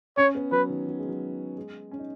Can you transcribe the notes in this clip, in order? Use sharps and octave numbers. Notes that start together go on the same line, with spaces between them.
C#4 C#5
B3
F#3 B4
D#3
F#3
G#3
F#3
G#3
C#4
D#4